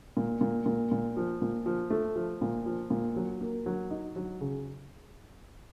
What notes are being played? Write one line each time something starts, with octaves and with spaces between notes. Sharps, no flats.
A#2
A#2
A#2
A#2
F3
A#2
F3
A3
F3
A#2
F3
A#2
F#3
A#3
F#3
D#4
F#3
C#3